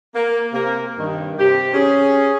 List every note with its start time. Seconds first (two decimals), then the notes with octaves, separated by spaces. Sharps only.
0.14 A#3
0.53 C3 A#3
0.98 G2 D#3
1.39 C3 G4
1.73 C#4 G#4